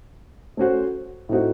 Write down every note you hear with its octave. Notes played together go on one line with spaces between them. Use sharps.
A3 C#4 F#4 C5
A2 A3 C4 D#4 F#4